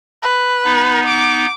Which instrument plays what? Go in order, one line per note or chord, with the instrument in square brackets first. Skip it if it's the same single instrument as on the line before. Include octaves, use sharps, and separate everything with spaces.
[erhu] B4
[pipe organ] B3 D#4
[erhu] D6